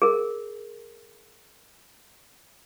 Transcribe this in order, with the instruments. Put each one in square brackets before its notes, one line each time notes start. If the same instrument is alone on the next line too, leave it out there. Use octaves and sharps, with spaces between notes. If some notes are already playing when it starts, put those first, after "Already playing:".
[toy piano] G#4 A#4